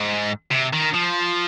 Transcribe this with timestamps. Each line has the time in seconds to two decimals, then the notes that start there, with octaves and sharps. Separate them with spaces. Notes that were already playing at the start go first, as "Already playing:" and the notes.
Already playing: G#2
0.51 C3
0.73 D#3
0.94 F3